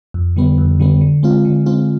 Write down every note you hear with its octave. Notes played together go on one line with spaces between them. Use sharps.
F2
D3 G3 B3
F2
D3 G3 B3
D3
G#3 C4 F4
D3
G#3 C4 F4